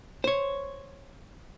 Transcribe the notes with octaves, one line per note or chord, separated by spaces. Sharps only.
C5 C#5